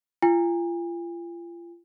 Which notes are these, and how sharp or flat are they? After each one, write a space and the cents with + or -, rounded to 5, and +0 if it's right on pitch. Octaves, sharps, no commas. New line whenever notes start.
F4 -35 G#5 -40